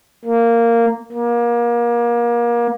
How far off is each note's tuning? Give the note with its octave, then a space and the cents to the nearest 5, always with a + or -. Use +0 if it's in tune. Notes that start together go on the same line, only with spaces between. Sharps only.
A#3 -10
A#3 +30